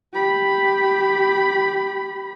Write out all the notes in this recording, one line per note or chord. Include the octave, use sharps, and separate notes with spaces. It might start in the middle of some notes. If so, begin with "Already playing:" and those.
G4 B5